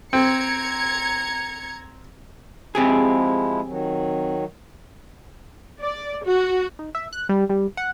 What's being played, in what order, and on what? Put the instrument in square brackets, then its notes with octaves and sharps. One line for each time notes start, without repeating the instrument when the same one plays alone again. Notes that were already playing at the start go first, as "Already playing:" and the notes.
[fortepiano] C4 [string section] A#5 G#6 C#7
[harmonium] F3 G#3 E4 [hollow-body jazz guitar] C4 G4 G#4
[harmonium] D#3 F#3
[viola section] D5
F#4
[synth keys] D#4
E5
F#6
G3
G3
F#5